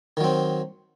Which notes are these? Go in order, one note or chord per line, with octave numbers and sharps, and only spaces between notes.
D#3 F#3 C4